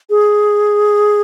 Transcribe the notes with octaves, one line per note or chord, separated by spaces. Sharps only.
G#4